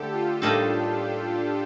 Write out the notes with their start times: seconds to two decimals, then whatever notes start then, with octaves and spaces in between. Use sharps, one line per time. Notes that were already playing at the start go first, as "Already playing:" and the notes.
Already playing: D3 A3 G4 A4
0.13 F4
0.42 A2 G3 A#3 D4 D#4 A4